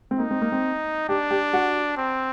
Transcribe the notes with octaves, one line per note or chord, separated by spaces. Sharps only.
C4
A#3 D#4
C4
A#3
C4
D4 G4
G4
F#4
C4